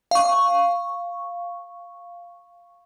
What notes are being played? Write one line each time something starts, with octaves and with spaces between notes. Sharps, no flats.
F5 C#6